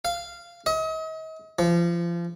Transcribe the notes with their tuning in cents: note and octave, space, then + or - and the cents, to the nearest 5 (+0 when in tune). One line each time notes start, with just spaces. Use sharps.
F5 -15
D#5 +40
F3 -30